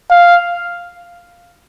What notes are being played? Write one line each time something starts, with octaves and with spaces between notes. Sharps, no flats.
F5